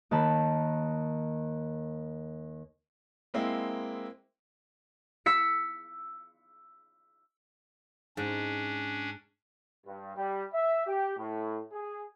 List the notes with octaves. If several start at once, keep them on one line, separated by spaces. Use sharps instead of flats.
D#2 D#3 A5 B5
G#3 A#3 C4 E4
E6 B6 C#7
G#2 C#4 D4
G2
G3
E5
G4
A2
G#4